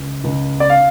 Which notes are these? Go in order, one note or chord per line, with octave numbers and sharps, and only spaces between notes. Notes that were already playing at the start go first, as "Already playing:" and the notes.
Already playing: C#2
C#2
D5
F5